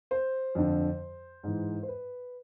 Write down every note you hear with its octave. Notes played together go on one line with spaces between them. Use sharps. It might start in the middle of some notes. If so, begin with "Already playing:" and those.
C5
F2 D3
G#2 E3
C5
B4